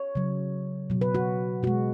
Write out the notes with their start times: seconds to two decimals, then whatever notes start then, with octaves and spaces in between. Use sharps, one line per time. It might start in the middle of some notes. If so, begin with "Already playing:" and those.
Already playing: C#5
0.15 C#3 F#3
0.90 B2 F#3
1.01 B4
1.15 F#4
1.63 B2 G#3 F#4